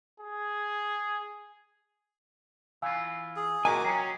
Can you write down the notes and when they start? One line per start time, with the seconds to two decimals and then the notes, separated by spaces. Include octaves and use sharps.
0.20 G#4
2.82 E3 F4 F5 G#5 E6
3.36 G#4
3.65 A#2 E3 F#4 A#4 D#5 G#5 D6
3.85 F#3 C#4 G#4 G5 A#5